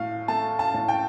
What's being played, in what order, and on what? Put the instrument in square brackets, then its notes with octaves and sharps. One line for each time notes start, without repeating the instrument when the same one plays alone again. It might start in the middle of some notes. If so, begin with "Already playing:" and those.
Already playing: [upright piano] A2 F5
A3 A5
A5
A2
G5